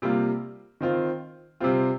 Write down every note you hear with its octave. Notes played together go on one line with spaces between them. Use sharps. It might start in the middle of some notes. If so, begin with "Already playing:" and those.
C3 G3 A#3 F4
D#3 C4 F4
C3 G3 C4 F4